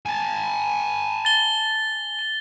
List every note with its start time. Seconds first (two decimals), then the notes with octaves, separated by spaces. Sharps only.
0.06 G#5 A5
1.25 A6 G7